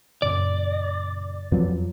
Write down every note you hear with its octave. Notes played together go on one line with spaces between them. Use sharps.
F#2 A#2 C#3 D5
F2 F3 F#3 B4